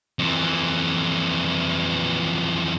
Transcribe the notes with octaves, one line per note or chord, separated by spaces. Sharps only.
F2 E3